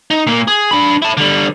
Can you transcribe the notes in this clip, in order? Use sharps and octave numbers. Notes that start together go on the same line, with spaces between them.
D#4
A#2 A#3
G#4
D4 B5
E4 A5
D3 G3